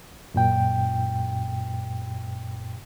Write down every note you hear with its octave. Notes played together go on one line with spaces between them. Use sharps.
F#2 A#2 G5